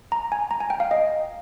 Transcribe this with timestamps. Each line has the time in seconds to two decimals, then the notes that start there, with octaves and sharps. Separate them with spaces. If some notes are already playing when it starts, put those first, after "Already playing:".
0.12 A#5
0.32 G#5
0.51 A#5
0.60 G#5
0.70 G5
0.80 F5
0.91 D#5